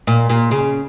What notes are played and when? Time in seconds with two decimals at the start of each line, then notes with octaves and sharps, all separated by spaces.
0.07 A#2
0.30 A#2
0.51 C#3